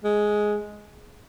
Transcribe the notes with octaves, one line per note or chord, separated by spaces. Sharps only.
G#3